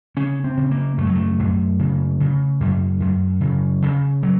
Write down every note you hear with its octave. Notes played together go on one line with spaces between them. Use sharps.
C#3 C#4
C4
C#3
A#3
F#2 A3
F#3
A3
F#2
C#3
C#3
F#2
F#2
C#3
C#3
F#3